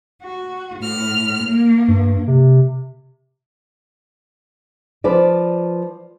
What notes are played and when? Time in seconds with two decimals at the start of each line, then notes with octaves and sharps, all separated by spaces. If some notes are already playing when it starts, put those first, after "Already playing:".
0.22 F#4
0.78 A2 F6
1.43 A#3
1.88 G2
2.27 C3
5.04 F3 B4 D5